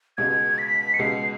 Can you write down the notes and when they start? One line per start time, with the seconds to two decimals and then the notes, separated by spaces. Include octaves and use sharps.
0.17 C#2 B2 G#3 G#6
0.58 B6
0.94 C#7
0.99 C#2 B2 G#3 C7